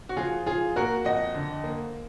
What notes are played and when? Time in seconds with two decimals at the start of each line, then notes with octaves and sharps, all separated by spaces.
0.09 F#4
0.16 F3 F4 G#4
0.46 F4 G#4
0.76 A#3 F#4 A#4
1.05 F2 D#5 F#5
1.35 D3
1.64 A#3